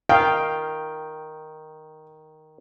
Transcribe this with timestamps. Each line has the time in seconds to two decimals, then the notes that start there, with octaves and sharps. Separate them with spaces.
0.09 D#3 F5 G5